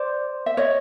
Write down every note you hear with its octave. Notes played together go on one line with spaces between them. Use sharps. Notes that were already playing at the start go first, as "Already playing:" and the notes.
Already playing: C5 D5
E5
C#5 D#5